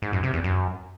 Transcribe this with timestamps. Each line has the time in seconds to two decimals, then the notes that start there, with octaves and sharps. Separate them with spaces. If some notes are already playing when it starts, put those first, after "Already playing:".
0.02 G#2
0.13 F#2
0.23 C3
0.34 E2
0.44 F#2